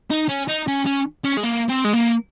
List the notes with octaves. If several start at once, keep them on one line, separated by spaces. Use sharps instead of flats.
D#4
C#4
D#4
C#4
C#4
C#4
G#3
A#3
C4
G#3
A#3